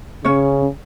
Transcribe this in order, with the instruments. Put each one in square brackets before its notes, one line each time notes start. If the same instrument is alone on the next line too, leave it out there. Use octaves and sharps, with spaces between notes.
[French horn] C#3 [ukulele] C#4 C#5